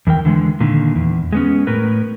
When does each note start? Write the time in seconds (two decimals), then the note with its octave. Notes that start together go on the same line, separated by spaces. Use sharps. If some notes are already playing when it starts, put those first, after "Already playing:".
0.07 E2 D#3 A#4 G5
0.25 D3 E3 G#3
0.60 A#2 D3 D#3
0.95 E2
1.33 G#3 B3 C#4
1.67 A2 A#4 B4